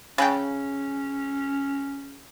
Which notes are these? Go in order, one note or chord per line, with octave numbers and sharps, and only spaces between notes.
C#3 C#4 G5 F#6 A6